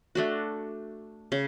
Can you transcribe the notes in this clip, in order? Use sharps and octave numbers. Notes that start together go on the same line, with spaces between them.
A3 D4 F#4
C#3